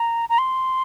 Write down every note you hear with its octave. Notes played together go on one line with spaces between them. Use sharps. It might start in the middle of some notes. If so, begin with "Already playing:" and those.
Already playing: A#5
A#5
C6